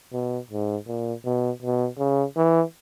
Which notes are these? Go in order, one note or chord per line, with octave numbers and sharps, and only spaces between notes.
B2
G#2
A#2
B2
B2
C#3
E3